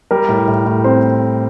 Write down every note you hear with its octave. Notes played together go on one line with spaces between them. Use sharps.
G3 A#4
A2
A2
A2
C4 C5